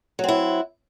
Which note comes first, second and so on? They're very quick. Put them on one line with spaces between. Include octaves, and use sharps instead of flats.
F#3 C4 E4